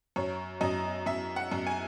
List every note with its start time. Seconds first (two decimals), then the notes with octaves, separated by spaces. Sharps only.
0.16 F#2 C#5
0.61 F#2 D#5
1.06 F#2 E5
1.36 F#5
1.52 F#2
1.67 G#5